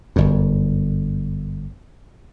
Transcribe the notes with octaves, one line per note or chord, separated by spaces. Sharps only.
G1 F#2